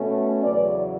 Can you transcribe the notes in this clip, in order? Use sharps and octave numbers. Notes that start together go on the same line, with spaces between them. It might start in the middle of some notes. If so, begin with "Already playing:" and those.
Already playing: B2 A3 C#4
E2 C#3 F#3 B4 D5